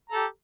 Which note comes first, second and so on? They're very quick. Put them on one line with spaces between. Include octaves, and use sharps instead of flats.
A#5 A4 G4